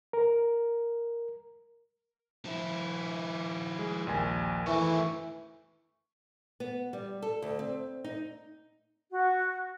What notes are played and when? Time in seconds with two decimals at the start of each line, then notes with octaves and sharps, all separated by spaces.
0.13 A#4
2.45 F3 E4
3.79 G#3
4.07 A#1 D#2 G#5
4.67 D#3 E3 A3 C#6
6.60 B3
6.93 G3
7.22 A4
7.42 D2
7.59 C4
8.04 D#4
9.11 F#4